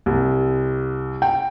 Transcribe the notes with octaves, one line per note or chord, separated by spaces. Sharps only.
C2
G5